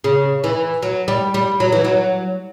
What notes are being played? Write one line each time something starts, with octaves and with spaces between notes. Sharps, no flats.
C#3
E3
F#3
G3
G3
F#3
E3
F#3